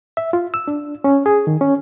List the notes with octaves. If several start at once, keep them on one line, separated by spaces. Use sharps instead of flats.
E5
F4
E6
D4
C#4
G#4
D#3
C#4